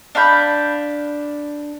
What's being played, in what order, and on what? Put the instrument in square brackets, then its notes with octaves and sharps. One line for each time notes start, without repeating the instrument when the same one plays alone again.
[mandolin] D4 F5 B5 G6